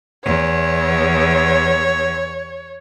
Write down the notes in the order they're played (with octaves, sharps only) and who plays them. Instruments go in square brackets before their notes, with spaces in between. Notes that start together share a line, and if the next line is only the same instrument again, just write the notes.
[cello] E2 [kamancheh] C#5